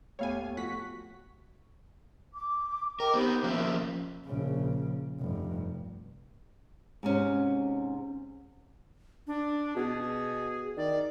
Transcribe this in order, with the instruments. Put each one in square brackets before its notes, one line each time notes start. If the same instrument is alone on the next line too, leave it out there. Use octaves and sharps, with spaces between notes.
[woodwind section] D#2 [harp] A2 B3 G4 [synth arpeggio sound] C#5 F5 G#5
[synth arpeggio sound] F2 F#5 B6 [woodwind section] F#4
[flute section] D6
[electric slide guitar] A#4 [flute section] D#5 G5 D6
[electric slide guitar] B3 C4 [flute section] D#4 G4 C5
[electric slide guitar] F3 A#3 C#4 [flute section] E5
[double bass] A#1 C#3
F1 G2
[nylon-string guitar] G#2 C3 C#4
[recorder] D4
[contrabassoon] B2 [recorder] G#4
[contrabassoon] D#3 [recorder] D5